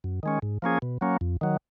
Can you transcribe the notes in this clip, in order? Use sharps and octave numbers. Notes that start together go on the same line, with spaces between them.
F#2
D#3 G#3 C#4
G#2
F3 A#3 C#4 G#4
B2
F#3 A#3 C#4
F2
D#3 F#3